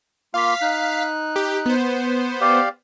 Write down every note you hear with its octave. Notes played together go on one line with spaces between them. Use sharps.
A#3 F4 F5 B6
D#4 F#6
G4
B3 C5
G4 D5 F5